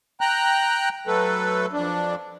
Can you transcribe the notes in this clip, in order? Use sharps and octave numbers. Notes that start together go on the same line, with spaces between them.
G5 A#5 F#6
F#3 A3 A4 B4
F2 D4